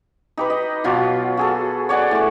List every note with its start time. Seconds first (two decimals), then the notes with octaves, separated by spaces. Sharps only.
0.37 D#4 G4 B4
0.50 D#5
0.84 B2 F#3 F4 D6
1.37 F#4 G#4 A4
1.89 C#5 D5 F#5 G#5
2.11 A2 C#6